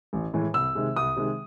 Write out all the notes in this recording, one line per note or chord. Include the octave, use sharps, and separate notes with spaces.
A1
A2 E3 G#3
C2 E6
C3 D#3 G#3
C2 D#6
C3 D#3 G#3